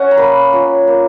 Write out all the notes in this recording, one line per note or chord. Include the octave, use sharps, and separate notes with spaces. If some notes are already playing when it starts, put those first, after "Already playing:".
Already playing: C#4 F#5
A#5
A#3 B5
C#4 F4
A#3